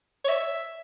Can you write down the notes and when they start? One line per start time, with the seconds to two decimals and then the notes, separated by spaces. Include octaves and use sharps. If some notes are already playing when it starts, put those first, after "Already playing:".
0.25 C#5
0.29 E5